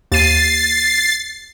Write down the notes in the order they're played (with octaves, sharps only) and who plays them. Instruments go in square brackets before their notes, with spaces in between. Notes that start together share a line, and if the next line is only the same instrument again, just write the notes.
[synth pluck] D#2 D#7 [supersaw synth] A6 C7